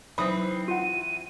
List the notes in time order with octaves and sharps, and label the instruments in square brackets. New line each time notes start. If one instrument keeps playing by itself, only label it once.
[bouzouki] E3 C4 [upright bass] F#3 D#4 [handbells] B5 D#6
[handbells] F4 F#5 [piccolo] D#7